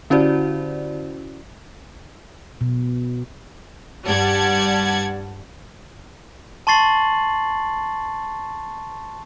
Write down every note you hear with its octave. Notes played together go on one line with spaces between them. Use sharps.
D3 C#4 E4 F#4 C5 D5
B2
G2 G3 D5 F#5 A5 G#6
A5 C6 C#6 A6 C7 F#7